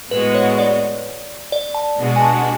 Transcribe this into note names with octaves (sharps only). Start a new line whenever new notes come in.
A2 G#3 B3 F#4 B4
C#5
D5
D5
A5
B2 G#3 D4 F#4
G#5
A5